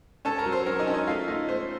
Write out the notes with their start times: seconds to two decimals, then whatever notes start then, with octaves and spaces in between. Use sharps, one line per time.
0.25 C#4 A4 A5
0.38 A#4 A#5
0.46 F#3
0.52 C5 C6
0.66 C#4 A#4 A#5
0.79 D#4 D#5
0.87 C#4
0.94 D#4 D#5
1.07 A3 F4 F5
1.28 A3 D#4 D#5
1.49 A3 C5